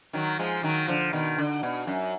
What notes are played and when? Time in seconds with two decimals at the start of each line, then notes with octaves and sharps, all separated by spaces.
0.13 D#3 F#3
0.39 F3 G#3
0.63 D#3 F#3
0.88 D3 F3
1.13 B2 D#3
1.38 D3
1.63 B2
1.87 F#2